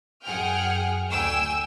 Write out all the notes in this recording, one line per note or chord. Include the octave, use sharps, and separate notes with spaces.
F#2 G#4 F#5 G5 F6
D2 G5 G#5 E6